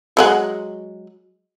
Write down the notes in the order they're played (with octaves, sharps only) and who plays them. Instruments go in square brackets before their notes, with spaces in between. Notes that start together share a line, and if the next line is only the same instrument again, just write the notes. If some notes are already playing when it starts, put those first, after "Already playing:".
[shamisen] F#3 G#3 F#5